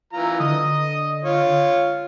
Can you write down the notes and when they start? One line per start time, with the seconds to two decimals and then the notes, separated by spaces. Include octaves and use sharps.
0.13 E3 F4 A#5
0.40 D3 D#5 D#6
1.25 F4 C#5